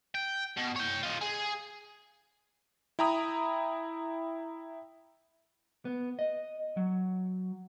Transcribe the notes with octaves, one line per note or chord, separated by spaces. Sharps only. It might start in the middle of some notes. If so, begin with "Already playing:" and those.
G5
B2
C#5 G5
F4 D#5
G#4
E4 G5 A#5 B5 D#6
B3
D#5
F#3